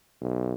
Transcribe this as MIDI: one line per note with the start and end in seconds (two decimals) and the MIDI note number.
0.21 0.54 35